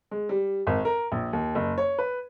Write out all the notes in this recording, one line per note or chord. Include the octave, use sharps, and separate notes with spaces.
G#3
G3
G#1
A#4
A#1
D#2
F#1
C#5
B4